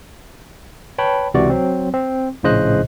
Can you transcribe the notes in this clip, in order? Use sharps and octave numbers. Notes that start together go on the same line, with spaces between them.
B4 C#5 G5 A5 B5
C#2 C3 E3 F#4 D5
F#3 C4
C4
A#1 A2 C#3 C5 D#5 F#6